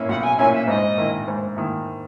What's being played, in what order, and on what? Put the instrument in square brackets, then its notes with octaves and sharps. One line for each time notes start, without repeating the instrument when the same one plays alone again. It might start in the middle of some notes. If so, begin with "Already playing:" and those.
Already playing: [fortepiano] A#2 A#3 C#4 E4
[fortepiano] B1 [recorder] F#5
[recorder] F#5
G#5
[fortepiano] A#2 A#3 C#4 E4 [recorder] G#5
[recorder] E5
[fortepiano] G#2 [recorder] D#5
[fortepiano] D#3 A#3 E4
G#2
D#3 A#3 E4